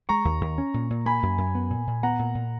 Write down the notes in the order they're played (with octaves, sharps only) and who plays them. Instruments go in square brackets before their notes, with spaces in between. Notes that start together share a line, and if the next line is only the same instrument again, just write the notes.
[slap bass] G#3 [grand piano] A#5 C#6
[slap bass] D#2
D#2
C#4
A#2
A#2
[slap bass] A#3 [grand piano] G#5 B5
[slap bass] F#2
F#2
B3
A#2
A#2
[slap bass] B3 [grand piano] F#5 A#5
[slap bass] A#2
A#2